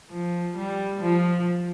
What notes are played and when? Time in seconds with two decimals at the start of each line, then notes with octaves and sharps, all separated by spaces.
0.11 F3
0.56 G3
1.01 F3